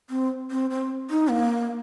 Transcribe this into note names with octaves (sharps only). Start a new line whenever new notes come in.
C4
C4
C4
D#4
A#3